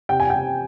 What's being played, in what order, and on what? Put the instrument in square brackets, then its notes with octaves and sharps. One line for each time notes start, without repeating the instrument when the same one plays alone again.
[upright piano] C3 G5
G#5
C3 G5